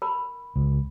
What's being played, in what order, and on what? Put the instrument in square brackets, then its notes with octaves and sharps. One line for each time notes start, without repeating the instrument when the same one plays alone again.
[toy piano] A#4 B5
[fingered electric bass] C#2